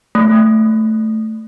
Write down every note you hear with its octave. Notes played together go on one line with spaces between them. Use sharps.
A3